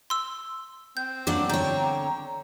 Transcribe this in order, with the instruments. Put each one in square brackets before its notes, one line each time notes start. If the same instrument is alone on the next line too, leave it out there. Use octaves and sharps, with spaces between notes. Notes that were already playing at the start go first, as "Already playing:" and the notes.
[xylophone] C6 E6
[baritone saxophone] C4 [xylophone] G6
[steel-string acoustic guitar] F#3 A#3 D4 [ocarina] D6
[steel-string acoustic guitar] D3 C#5 [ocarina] A#5 [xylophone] G6